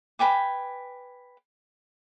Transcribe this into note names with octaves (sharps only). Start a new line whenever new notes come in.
B4 G5 G#5 D6